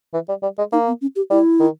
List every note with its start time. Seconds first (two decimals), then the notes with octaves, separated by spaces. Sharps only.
0.14 E3
0.29 G3
0.43 G3
0.58 G#3
0.72 A#3 D#4
0.87 B3
1.01 C#4
1.16 G4
1.30 G3 E4
1.60 D#3